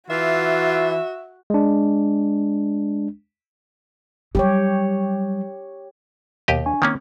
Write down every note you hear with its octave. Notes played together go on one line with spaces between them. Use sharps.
E3 F4 F#4 E5
G#3 D4
F#3 G3 G4 C#5
D#2 B2 G4 D#5
D4 G#5 C#6
D#3 A#3 C4 C#4